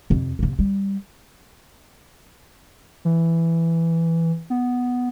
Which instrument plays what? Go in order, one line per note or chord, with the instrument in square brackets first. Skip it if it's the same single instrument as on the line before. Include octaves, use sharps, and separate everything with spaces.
[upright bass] F2 C3
C3 A#3
G3
[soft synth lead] E3
B3